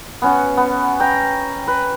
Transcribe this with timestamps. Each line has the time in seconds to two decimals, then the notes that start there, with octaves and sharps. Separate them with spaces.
0.22 B3 C#4 F#4
0.57 B3
1.00 G5 A#5
1.68 B4